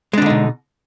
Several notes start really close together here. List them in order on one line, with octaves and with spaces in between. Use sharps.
G#3 D4 D3 D#4 B2